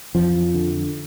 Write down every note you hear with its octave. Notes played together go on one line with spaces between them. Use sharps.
F2 F3
D3